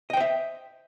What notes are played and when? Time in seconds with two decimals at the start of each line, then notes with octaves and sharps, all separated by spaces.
0.10 D#5
0.13 G5
0.17 C5
0.20 E5